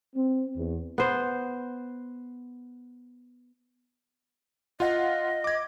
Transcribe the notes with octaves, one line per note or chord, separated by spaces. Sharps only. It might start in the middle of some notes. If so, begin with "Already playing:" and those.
C4
E2
B3 C5
F4 D#5 F5 F#5
D6 G#6